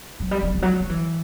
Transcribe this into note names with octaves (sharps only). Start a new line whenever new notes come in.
F#3
G3
F#3
E3
F#3
F#3
E3